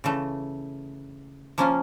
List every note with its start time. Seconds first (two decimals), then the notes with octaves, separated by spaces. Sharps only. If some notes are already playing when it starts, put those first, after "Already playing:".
0.04 C#3 E3 A3
1.58 F3 A#3 C#4 F4